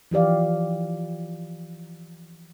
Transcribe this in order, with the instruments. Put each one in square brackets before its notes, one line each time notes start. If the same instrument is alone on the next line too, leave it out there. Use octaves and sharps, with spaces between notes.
[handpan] E3 F3 G4 D5 F5